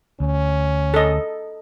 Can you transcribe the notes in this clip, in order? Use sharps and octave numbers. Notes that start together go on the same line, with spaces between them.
D2 C#4
A4 D#5